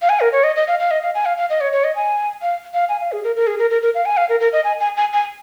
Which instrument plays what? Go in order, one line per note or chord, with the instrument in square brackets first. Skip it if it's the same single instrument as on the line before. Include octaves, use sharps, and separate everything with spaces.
[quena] F5
G#5
A#4
C#5
D#5
D#5
F5
F5
D#5
F5
G#5
F5
F5
D#5
C#5
C#5
D#5
G#5
F5
F5
G#5
F5
G#4
A#4
A#4
G#4
A#4
A#4
A#4
F5
G#5
F5
A#4
A#4
D#5
G#5
G#5
G#5
G#5